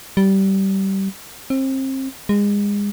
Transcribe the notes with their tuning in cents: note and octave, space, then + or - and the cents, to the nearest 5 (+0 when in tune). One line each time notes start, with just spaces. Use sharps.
G3 -20
C4 +30
G#3 -30